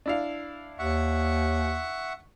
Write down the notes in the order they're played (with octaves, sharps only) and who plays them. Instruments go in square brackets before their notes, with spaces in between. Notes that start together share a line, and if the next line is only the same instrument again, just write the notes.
[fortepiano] D4 E4 F5
[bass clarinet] D#2 [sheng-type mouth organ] E5 F#5 C#6